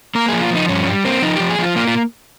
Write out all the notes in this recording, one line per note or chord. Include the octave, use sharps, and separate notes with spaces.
A#3 A#4
F3 G#4
F4
F3 D#4
G2 C#4
G3
A#3 C4
F3 D#4
F3 G4
G#4
F3 F4
A#3 F4
F4